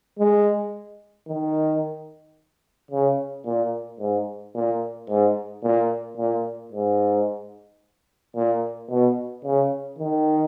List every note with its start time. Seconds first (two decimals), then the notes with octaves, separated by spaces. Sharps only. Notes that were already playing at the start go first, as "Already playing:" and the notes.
0.19 G#3
1.28 D#3
2.91 C#3
3.46 A#2
4.00 G#2
4.55 A#2
5.09 G#2
5.63 A#2
6.17 A#2
6.72 G#2
8.36 A#2
8.90 B2
9.44 C#3
9.99 D#3